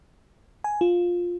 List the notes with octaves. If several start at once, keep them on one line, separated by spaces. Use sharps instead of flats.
G#5
F4